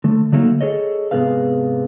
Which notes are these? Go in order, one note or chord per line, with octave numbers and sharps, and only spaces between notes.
D3 A3
D3 F#3 A3 A#3 D#4
G#4 A4 C#5 D#5
G#2 C3 B3 G#4 B4 F5